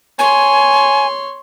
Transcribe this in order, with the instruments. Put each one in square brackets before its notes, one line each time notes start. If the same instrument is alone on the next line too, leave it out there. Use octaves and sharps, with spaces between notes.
[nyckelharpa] C#5 C6 [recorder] G#5